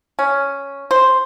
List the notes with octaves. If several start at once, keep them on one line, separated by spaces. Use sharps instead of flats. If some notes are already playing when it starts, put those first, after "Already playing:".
C#4
C5